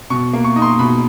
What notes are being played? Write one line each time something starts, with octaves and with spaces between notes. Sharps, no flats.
B2 C#6
A#3
C#6
D#4
C6
B2 B5